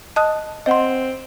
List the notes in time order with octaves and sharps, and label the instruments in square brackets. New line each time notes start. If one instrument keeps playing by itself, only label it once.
[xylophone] D#5 A5 D#6 F#6
[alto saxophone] C4 [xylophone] D#5 F#5 C6